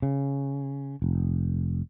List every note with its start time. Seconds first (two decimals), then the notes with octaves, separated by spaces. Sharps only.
0.02 C#3
1.02 F1